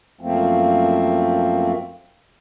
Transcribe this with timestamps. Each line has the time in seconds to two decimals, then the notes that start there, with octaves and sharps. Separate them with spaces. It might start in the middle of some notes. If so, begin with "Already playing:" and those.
0.21 F#2 F3 A3 A#3 C4